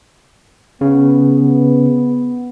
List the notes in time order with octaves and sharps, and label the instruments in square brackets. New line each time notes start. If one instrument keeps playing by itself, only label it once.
[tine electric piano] C#3 [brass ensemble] B3